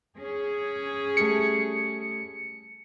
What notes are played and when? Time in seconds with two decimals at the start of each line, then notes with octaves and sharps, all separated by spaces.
0.19 C#4 G#4
1.17 G3 A3 C#7